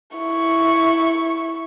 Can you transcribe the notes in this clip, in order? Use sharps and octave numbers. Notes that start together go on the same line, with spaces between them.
E4 C#6